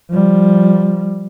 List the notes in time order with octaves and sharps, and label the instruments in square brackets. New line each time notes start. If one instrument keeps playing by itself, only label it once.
[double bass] F3 G3